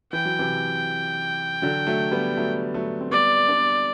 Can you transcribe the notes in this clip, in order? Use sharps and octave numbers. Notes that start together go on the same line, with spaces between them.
E3 G5
F#3
C3 E3
D3 F#3
F#3 A3
G3 B3
F#3 A3
F#3 A3
C4
G3 B3 D5
B3 D4